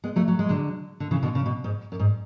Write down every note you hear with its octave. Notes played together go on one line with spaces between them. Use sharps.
G#3 B3
F#3 A3
F#3
G#3
D3 F#3
D3
C#3 E3
B2 D3
C#3
B2
G#2
F#2
G#2